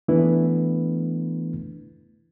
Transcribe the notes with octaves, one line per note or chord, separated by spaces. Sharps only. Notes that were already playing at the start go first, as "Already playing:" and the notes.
E3 A3 B3 D4 E4 B4